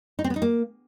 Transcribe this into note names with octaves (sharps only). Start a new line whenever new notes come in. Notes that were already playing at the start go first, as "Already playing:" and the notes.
D#4
C4
B3
D#4
A#3